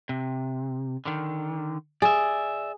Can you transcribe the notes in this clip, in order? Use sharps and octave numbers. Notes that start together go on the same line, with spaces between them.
C3
D3 D#3
G#4 D5 E5